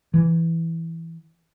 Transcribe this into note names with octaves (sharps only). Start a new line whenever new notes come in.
E3